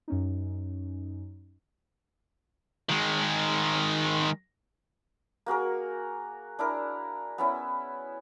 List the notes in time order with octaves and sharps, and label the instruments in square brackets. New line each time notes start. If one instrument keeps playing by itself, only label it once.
[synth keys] F#2 C#4 D#4
[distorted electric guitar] D#3 G#3
[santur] A#3 F#4 G#4 A#4
D4 E4 A#4
B3 C#4 E4